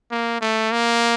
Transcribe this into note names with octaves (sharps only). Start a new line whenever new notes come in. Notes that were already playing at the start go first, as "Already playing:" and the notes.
A#3
A3
A#3